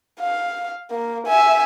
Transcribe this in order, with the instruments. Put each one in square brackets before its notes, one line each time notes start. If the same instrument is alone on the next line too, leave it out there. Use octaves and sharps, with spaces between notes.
[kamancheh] F5
A#3
E5 G#5